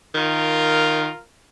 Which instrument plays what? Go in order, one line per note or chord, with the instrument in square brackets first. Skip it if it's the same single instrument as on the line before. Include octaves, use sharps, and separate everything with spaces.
[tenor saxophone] D#3 [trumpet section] F4 A#4